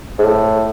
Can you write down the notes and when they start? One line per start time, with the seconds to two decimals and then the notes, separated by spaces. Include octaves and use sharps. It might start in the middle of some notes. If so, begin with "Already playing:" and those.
0.19 G#2
0.24 A2